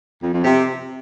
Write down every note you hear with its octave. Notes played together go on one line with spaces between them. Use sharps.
F2
F2
C3